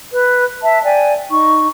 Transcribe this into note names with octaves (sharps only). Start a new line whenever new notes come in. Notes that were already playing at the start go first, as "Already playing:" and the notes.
B4
E5 A5
D5 G5 G#5
D#4 C#6